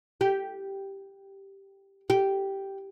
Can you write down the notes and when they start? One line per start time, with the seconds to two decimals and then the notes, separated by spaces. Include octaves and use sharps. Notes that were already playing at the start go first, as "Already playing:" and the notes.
0.21 G4
2.10 G4